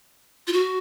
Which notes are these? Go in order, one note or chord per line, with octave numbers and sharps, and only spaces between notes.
F4
F#4